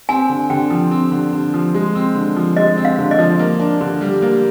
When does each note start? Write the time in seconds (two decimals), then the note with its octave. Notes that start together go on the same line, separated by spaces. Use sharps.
0.09 C4 G#5
0.29 D3
0.50 D3 G5
0.70 F3
0.91 C4
1.12 D3
1.33 D3
1.54 F3
1.74 G#3
1.95 C4
2.15 D3
2.36 F3
2.57 G#3 D#5
2.77 C4
2.85 F5
2.99 D3
3.11 D#5
3.19 F3
3.39 A#3
3.60 D4
3.81 D3
4.01 G3
4.22 A#3